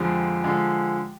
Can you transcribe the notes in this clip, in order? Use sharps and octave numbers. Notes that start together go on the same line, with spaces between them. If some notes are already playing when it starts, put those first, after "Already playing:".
Already playing: F2 D3 F3 G#3 G4
D3 F3 G#3